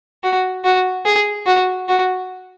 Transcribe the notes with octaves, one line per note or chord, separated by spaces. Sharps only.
F#4
F#4
G#4
F#4
F#4